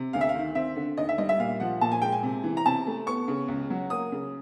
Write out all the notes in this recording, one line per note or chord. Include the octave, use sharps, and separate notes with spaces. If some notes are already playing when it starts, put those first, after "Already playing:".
Already playing: C3
D2 F5
E5
F5
D#3
C4 E5
D3
D#2 D#5
E5
G3 D#5
E5
A#2 F5
F3 F#5
A#2 A5
G#5
G#3 G5
G#5
C3
E3
A#5
C3 A5
A3
B3 C#6
C#3
C#2
F#3
A#3 D#6
C#3